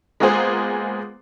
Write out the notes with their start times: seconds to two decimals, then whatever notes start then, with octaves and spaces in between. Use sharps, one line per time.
0.20 G#3 A#3 B3 F4 G#4 C5